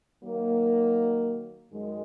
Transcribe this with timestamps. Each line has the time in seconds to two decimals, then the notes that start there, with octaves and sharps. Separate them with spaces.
0.22 D#3 F#3 A#3
1.72 F#2 D#3 G#3